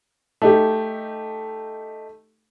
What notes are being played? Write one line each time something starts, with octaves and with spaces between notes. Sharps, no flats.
A3 D#4 G4